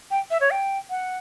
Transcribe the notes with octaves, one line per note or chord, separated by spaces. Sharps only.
G5
E5
C#5
G5
F#5